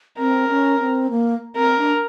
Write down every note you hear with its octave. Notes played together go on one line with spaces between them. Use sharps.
C4 A#4
C#4
C4
A#3
C4 A#4
D4